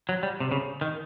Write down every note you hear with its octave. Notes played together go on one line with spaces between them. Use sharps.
F#3
G3
C3
C#3
D#3